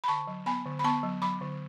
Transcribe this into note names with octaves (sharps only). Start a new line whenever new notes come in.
B5
D3 A5 C#6
F#3
B3 G#5 B5
D3
B5
B3 A5 C#6
F#3
F#3 B5 D6
D3